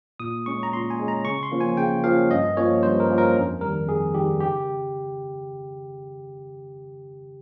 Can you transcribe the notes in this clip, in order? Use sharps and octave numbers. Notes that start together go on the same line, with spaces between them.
A#2 D#6
G#3 C#4 C#6
A#5
A#2 C6
G#5
G#3 C#4
A#5
C#3 C#6
C6
F3 A#3 C#4
G#5
C#3 G5
F3 A#3 C#4 F5
G2 D#5
F3 A#3 C#4 C#5
G2 C5
A#4
F3 A#3 C#4
A#4
F2
D#3 G3 A#4
F2 G#4
D#3 G3 G4
C#3 G4